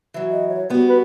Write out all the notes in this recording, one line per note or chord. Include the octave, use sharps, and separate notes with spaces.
E3 F#3
D#5
C#5
G3 B3 F#4
B4